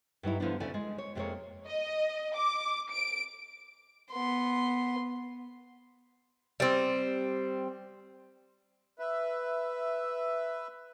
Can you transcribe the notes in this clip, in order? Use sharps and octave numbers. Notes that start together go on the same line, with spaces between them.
G2 F#3 D#4 E4
D3 E3 F3 A#3 B3 D4
D2 C#3 E4 A4 D5 G#5
G#3
C#5
F2 C3 F#3 G#3 A#3 C#5
D#5
D6
D7
B3 C6
G3 C4
B4 E5